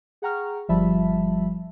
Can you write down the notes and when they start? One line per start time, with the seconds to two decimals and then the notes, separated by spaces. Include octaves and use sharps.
0.22 G#4 F#5 G5 A#5 C#6 F6
0.69 G1 F3 G3 E5 A5 B5